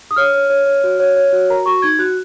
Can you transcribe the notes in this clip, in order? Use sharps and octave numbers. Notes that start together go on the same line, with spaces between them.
D#6
C#5 F6
C#5
C#5
C#5
F#4
C#5
C#5
F#4
A#4 A#5
F#4 C#6
D#4 G#6
F#4 F#6